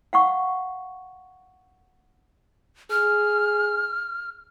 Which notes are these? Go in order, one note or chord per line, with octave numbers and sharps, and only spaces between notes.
F5 F#5 C#6
G#4 F6